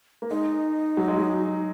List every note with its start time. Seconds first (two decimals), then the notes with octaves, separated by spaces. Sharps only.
0.22 A#3
0.31 G#3 D#4
0.97 F#3
1.08 G#3
1.18 F#3